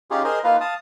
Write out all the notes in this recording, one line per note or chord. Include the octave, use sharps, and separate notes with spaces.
C#4 D#4 F4 G4 G#4
G#4 A#4 C5 D#5
A#3 D#4 F4 B4 F5
F5 A5 D#6